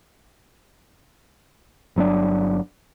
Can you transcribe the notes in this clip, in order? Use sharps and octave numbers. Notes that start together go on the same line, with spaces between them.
G1 F#3 C4 D4